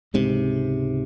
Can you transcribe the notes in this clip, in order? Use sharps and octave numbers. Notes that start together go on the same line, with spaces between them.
C#2 G#2 C3